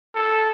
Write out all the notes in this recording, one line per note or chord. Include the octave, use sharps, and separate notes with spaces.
A4